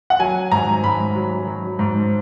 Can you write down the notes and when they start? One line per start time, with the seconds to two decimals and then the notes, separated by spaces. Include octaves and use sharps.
0.10 F#5
0.19 F#3 G#5
0.52 G#2 A#5
0.84 G#2 B5
1.15 F#3
1.47 F#3
1.79 G#2